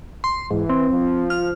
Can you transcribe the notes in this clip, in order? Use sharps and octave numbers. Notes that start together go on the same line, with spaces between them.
C6
G#2 E3
C4
F3
F6